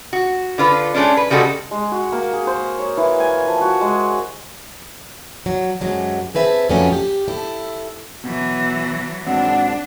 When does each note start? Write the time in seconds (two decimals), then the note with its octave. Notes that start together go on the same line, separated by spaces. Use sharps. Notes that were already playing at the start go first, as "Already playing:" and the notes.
0.13 F#4
0.58 D3 F4 B4
0.94 G#3 A3 C#4 D4
1.17 B4
1.30 C#3 G3 G#3 F#4 A4
1.71 G#3
1.92 F#4
2.12 A#3
2.33 G#4
2.47 C5
2.79 C#5
2.97 E3
3.20 G#5
3.48 F3
3.61 F#4
3.81 G#3
5.46 F#3
5.81 F#2 C3 F#3 G#3 A3
6.35 C4 G#4 B4 E5 A5
6.69 F2 F#3 A3 B3 C#4 D4
6.93 G4
7.28 E4 A4
8.24 B2 E3 F#3
9.27 G#2 F#3 C4 D4 F#5